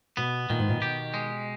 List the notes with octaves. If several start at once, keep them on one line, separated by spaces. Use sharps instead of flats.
B2 B3
A#2 D#3
G#2
A#2
B2 G4
G#3